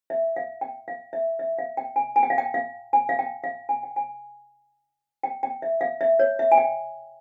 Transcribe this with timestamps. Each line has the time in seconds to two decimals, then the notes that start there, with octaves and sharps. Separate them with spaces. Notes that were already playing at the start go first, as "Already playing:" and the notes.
0.10 E5
0.36 F5
0.61 G5
0.88 F5
1.13 E5
1.39 E5
1.59 F5
1.77 G5
1.96 G#5
2.16 G#5
2.23 G5
2.30 F5
2.38 G5
2.54 F5
2.93 G#5
3.09 F5
3.19 G5
3.44 F5
3.69 G#5
3.83 G5
3.96 G#5
5.23 G5
5.43 G5
5.62 E5
5.81 F5
6.01 E5
6.19 C#5
6.39 E5
6.52 G#5
6.58 G5